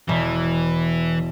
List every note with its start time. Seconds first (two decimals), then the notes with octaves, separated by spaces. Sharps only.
0.09 E1 E3